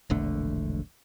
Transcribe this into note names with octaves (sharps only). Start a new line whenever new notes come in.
E1 A#1 D3 A3